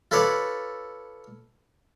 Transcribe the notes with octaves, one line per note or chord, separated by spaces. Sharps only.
F4 A4 B4 C#5 D5